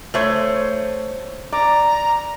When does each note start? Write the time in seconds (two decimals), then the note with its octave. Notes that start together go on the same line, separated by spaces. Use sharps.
0.14 A3 C5 C#5
1.52 D5 A#5